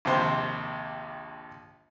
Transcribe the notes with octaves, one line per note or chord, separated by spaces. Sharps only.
A#1 D#2 C3 C5